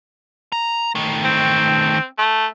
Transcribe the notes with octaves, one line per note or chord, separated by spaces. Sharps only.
A#5
D#3 A3
C4
A3